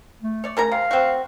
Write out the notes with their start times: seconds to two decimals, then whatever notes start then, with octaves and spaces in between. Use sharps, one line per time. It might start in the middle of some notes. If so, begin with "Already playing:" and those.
0.23 A3
0.44 C#5 D5
0.57 C#3 A#4 A#5
0.71 C3 F5
0.91 C4 F#4